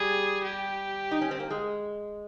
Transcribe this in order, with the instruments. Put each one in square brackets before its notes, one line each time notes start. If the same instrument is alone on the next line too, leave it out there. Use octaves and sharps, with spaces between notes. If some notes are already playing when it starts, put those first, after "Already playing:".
Already playing: [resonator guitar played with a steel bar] G3 [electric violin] G#4
[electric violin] G4
[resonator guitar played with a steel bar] D#4
C#4
C4
A#3
G#3